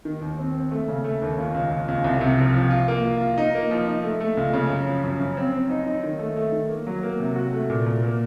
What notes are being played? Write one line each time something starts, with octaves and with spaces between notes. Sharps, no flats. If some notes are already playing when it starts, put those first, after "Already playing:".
D#3
D#2
C4
C4
A3
C#3
A3
D#2
C#2
C#2
C#2
C#2
C2
C3
F3
F3
F4
A#3
F4
F4
D#4
A#3
F3
D#4
A3
A3
C#2
C#3
F#2
F3
F#2
F#2
C4
C4
D#4
D#4
D#3
A3
A3
D#3
A#3
F#3
A#3
C3
F#4
A3
A#2
A#2
A#3